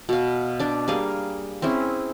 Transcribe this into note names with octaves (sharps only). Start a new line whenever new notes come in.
B2 F5
D4 D5
G3 A#3 G#4 F5
C4 C#4 E4 G#4